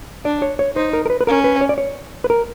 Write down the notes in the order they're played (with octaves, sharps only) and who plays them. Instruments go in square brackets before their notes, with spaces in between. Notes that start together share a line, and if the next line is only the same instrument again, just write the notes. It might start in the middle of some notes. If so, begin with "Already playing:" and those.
[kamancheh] D4 [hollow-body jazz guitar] D5
[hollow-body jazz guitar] C#5
C#5
[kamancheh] D#4 [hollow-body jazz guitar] C5
[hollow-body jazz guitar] A#4
A#4
B4
B4
[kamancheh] C#4 [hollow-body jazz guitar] A#4
[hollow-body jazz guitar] B4
C#5
D5
C#5
B4
A#4